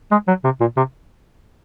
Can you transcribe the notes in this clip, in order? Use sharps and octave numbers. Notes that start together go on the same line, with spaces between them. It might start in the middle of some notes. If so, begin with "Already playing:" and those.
G#3
F#3
C3
A#2
C3